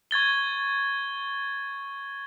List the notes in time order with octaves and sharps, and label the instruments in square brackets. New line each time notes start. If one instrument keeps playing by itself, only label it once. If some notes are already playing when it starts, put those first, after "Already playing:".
[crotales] C#6 G#6 A6 G7